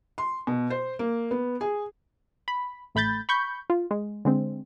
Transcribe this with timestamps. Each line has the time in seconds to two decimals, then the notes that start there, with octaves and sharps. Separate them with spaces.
0.18 C6
0.47 B2
0.70 C5
0.99 A#3
1.31 B3
1.61 G#4
2.48 B5
2.95 A1 A3 B5 G6 A6
3.29 B5 C#6 G6
3.70 F4
3.91 G#3
4.25 D3 G#3 C4